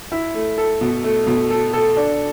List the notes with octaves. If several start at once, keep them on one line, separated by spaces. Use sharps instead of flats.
E4
A3
A4
B2
A3
B2
A4
A4
D4